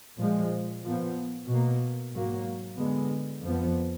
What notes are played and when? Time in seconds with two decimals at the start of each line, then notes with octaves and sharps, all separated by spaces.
0.18 A#2 F3 G#3
0.84 A#2 F3 B3
1.48 B2
1.53 A#3
2.14 G#2 F#3 A#3
2.78 D3 G#3 B3
3.44 F2 F3 B3